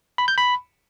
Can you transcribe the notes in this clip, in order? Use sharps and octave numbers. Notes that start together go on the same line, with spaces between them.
B5
G6
B5